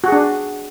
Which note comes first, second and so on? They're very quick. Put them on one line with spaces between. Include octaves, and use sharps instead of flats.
F#4 G#4 D4